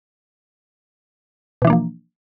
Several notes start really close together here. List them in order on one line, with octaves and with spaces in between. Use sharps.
B2 E3 D4 A#3 F3